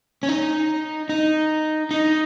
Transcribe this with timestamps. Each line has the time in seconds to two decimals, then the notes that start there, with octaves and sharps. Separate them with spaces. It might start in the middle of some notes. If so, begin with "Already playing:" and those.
0.23 C#4
0.29 D#4
1.09 D#4
1.91 D#4